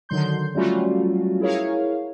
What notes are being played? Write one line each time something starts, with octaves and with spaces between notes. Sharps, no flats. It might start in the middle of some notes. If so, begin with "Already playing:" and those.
D3 D#3 F#3 C6 G6
F#3 G3 A3 C#4 F4 F#4
E4 G#4 A#4 C#5 F5